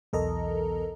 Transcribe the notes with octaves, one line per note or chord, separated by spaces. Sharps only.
B1 E2 A4 A#4 D#5 A#5